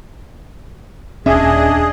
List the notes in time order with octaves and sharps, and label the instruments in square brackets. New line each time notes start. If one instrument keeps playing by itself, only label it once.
[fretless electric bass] D#1 C#4 [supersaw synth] D4 D#5 [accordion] G#4 [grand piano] E5